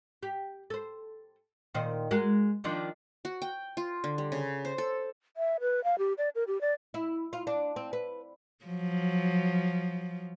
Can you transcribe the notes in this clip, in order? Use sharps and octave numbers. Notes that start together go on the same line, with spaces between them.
G4
A4 C5
A#2 D#3 C5
G#3 F#4 A#4
D#3 F3 D4
F#4
G5
F4
D3
G3
C#3
C5
A4
E5
B4
F5
G4
D5
A#4
G4
D5
E4
F4
D4
C4
B4
F3 F#3